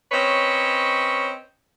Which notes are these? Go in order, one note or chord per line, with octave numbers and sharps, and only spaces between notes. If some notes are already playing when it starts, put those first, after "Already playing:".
C4 C#4 B4 C#5 D#5